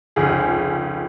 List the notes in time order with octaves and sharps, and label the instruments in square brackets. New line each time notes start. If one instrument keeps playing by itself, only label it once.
[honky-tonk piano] F1 C#2 G#4